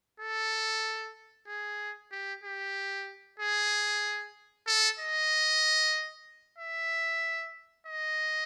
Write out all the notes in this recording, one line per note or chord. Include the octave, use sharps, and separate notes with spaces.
A4
G#4
G4
G4
G#4
A4
D#5
E5
D#5